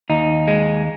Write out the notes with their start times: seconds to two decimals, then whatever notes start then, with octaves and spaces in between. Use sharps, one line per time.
0.10 D#2 D#4
0.48 G#3